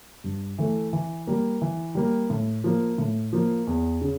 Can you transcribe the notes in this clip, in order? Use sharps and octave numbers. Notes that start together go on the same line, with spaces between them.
G2
E3 A3
E3
G3 A#3
E3
G3 A#3
A2
F3 A#3
A2
F3 A#3
E2
C#3